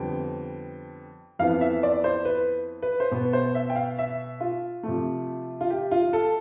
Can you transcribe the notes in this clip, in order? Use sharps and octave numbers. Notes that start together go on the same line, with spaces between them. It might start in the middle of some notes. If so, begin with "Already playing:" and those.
Already playing: F2 D3 G3 B3 G5
F2 E3 B3 F5
E5
D5
C5
B4
B4
C5
B2 B3 B4
C5
E5
G5
F5
E5
F4
C3 F3 A3
F4
G4
F4
A4